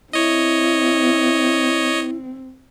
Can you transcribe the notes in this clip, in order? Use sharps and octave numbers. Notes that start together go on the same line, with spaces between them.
C4 E4 C#5 D#5